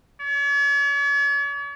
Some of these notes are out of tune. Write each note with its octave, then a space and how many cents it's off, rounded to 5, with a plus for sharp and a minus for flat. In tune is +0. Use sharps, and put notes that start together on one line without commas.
C#5 +45